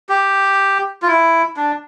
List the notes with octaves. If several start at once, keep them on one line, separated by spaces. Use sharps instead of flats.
G4
F4
E4
D4